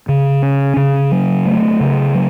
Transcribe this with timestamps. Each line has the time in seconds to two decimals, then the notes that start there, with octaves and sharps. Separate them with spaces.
0.09 C#3
0.43 C#4
0.77 C#3
1.11 F#3
1.46 A3
1.81 C#3
2.14 F#3